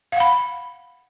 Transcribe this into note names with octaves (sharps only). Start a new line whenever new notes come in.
F5 F#5 B5